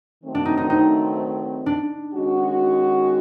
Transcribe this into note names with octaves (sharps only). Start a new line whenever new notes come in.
D#3 F#3 A3 C4
D4
D#4
D#4
D#4
D4
D#3 G#3 C#4 F#4